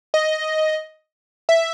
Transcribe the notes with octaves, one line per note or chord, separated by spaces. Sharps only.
D#5
E5